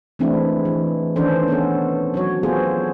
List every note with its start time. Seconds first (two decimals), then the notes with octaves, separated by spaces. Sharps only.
0.19 E3 G#3 A3 C4 D4 E4
0.65 E3
1.16 D#3 E3 C#4 D4 A4 C5
1.48 B3 C#4 A4
2.14 F#3 F#4 C#5
2.43 B3 F4 G#4 A4 C5